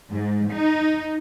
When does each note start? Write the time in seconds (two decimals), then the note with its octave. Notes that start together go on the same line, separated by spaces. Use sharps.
0.12 G#2
0.53 D#4